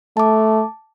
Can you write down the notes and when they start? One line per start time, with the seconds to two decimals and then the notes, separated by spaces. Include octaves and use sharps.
0.17 A3 A5 D6